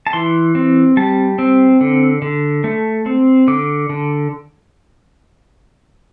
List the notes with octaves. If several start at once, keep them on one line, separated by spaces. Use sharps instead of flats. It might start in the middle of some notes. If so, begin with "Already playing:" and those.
A5
E3 C6
C4
G3 A5
C4
D3
D3
A3
C4
D3 D6
D3